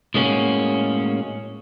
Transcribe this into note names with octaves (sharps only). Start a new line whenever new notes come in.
A2 G#3 A#3 C#4 F#4